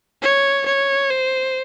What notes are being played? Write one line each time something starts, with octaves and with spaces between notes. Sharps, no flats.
C#5
C#5
C5